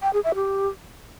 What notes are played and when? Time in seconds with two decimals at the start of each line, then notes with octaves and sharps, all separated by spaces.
0.02 G5
0.13 G#4
0.24 E5
0.35 G4